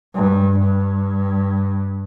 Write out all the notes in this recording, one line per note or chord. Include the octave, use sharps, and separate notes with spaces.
G2
G2